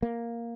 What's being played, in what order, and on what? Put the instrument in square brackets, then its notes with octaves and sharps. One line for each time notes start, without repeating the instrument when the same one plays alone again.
[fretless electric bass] A#3